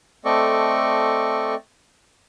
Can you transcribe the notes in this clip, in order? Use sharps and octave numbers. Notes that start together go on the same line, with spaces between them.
A3 C4 A4 D5 D#5 C#6